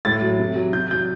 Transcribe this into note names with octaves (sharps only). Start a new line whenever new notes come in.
A2 A6
F#3
C3
F#3
C3 G6
F#3 G6